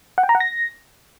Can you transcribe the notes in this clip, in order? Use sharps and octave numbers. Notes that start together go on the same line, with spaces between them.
F#5
G5
A#5
F#5
A#6